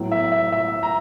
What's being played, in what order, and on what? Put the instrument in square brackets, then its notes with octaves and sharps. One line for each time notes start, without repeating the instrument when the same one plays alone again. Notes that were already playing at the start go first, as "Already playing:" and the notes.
Already playing: [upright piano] A2 F#3 B3
E5
E5
E5
A#5